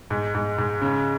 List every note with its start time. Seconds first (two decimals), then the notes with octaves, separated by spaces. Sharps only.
0.10 G#2
0.34 G#2
0.58 G#2
0.82 C#3